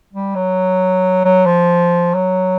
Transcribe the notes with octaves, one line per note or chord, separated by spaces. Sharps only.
G3
F#3
F#3
F3
F#3